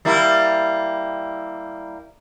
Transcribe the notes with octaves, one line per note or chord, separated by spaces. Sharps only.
G3 A#3 E4